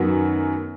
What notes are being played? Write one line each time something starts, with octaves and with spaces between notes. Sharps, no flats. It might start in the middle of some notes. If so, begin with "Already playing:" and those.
Already playing: F#2 D#3 B3 F#4